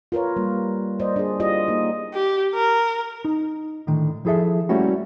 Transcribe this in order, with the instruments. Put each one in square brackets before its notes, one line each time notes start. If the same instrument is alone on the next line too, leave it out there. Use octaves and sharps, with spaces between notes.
[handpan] F4 A#4 B4 C#5
G3 A#3
C5 D5 D#5
D4 G#4
E4 F4 G4 C5 D#5
A#3 D#4
[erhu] G4
A#4
[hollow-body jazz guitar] D#4
A2 D3 D#3
F3 E4 G#4 A4 E5
G3 A3 A#3 C#4 E4 F#4